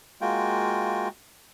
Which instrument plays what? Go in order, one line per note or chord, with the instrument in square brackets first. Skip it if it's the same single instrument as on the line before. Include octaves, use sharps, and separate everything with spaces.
[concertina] G#3 A#3 F4 F#4 G5